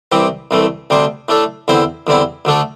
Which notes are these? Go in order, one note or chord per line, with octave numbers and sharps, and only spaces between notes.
C2 C3 E3 C4 G4
C2 C3 E3 A3
D2 C3 G3 D4 C5
A2 A3 D4 A4
E2 D3 C4 E4 C5
E2 D3 G3 C4 E4
D2 D3 A3 D4 A4